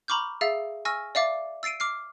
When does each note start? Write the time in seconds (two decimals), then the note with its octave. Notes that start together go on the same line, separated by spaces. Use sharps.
0.08 A#5 B5 C#6 D6 F6 G6
0.41 G#4 E5 F5 E6 A6
0.85 G#5 C#6 E6 F6 A#6
1.15 D5 E5 F5 D6 A6
1.63 E6 A6 C7 D7 D#7
1.80 D6 F6 C7